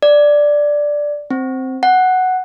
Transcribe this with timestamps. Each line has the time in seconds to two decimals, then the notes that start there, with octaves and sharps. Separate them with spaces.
0.03 D5
1.30 C4
1.83 F#5